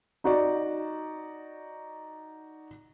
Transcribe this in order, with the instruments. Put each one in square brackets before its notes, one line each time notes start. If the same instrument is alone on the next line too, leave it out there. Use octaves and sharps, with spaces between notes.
[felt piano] D#4 F#4 D5